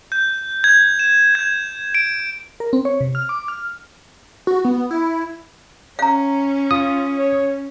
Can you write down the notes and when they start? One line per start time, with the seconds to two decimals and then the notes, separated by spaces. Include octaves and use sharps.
0.12 G6
0.64 G#6
0.99 E7
1.35 G#6
1.95 D7
2.60 A#4
2.73 C4
2.85 C#5
3.01 C3
3.15 F6
3.29 D6
3.48 F6
4.47 F#4
4.65 B3
4.91 E4
5.99 C#4 F5 A#5
6.71 F4 D#6
7.18 C#5